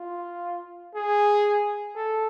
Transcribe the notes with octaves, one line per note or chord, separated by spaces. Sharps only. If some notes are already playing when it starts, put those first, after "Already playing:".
Already playing: F4
G#4
A4